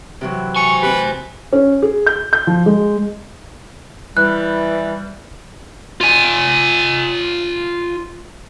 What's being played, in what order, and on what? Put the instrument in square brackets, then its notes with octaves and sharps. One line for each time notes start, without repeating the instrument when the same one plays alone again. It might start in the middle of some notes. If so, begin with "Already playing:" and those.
[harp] C3 E3 F#3
[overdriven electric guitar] C5 G#5 [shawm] C#6
[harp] C4 G4 [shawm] B4
[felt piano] C#4
G#4
G6
G6
F3
G#3
[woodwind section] E3 G3 [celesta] F#6
[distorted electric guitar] F4 G#5